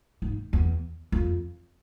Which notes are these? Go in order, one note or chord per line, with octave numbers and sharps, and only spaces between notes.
G#2
E2
F2